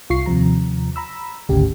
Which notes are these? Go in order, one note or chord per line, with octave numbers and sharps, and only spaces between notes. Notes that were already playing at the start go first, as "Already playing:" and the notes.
C2 F4 C#6 C7
D#2 C3 F3 A#5
A#5 B5 E6
G#1 D2 C#3 G4